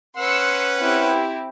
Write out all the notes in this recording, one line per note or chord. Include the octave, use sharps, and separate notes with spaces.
C#4 B4 F#5 C6 E6 C#7
C4 E4 G4